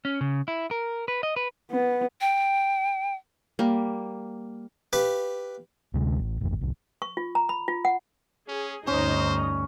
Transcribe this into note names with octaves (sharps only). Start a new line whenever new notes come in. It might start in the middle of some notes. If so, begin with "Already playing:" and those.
C#4
C#3
E4
A#4
B4
D#5
B4
B3
G5
G3 A#3
G4 B4 F5
D2 C3 G#3
A1
D1 G#1 F2
E1 C2
C#6
F4
A#5
B5
F4
F#5
C#4 G#4
D2 G2 C#4 D#4 C5 D#5 A#5